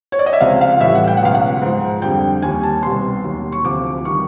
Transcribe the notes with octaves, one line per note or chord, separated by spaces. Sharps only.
C#5
D5
D#5
E5
C#2 C3 F3 F5
F5
A2 E3 G3 E5
F#5
G5
F#5
C#2 B2 F#3 F5
F#5
G#2 F3
F2 D3 G3 G5
D#2 D#3 G3 G#5
A5
C2 B2 G3 C6
D#2 D#3 F#3
C#6
D2 C3 F3 D6
D#3 G3 C#6